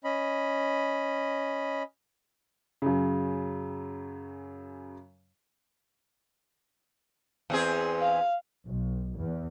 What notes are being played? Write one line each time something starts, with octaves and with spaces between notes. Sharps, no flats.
C#4 D#5 B5
F#2 C#3
E2 C4 G#4
F5
B1
E2